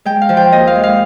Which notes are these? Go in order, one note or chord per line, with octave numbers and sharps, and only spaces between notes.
G#3 G5
F5
F3
G5
D#2 D#5
F5
G#3
F5